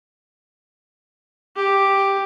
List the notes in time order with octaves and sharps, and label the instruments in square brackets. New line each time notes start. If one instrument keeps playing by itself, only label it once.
[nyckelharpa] G4